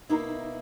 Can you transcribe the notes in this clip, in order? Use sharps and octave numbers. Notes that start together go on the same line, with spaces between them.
B2 A#3 D#4 E4